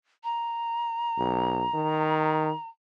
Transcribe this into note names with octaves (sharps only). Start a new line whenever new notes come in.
A#5
B1
D#3